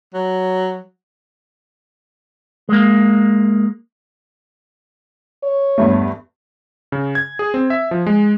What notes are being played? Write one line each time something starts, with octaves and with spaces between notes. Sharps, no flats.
F#3
G#3 A#3
C#5
E2 G2 A3
C#3
G#6
G#4
C4
E5
F3
G#3